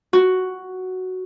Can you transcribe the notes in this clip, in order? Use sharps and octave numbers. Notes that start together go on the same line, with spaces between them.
F#4